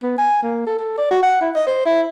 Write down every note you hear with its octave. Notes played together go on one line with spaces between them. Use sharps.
B3
G#5
A#3
A4
A4
D5
F#4
F#5
E4
D#5
C5
E4